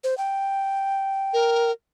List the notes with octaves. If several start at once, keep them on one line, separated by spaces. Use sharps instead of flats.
C5
G5
A#4